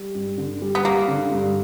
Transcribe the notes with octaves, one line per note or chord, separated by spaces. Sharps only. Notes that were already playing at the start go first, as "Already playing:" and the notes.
Already playing: G3
G2
D3
G3
B3
G3 A#3
D3
G2